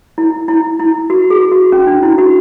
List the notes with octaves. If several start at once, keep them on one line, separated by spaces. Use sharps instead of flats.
E4
E4
E4
F#4
G#4
F#4
C#4
D4
E4
F#4